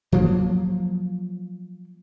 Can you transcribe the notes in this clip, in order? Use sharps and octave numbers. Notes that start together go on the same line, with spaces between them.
F3 F#3 A#3